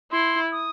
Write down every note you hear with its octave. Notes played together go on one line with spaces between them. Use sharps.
E4 C6
D#6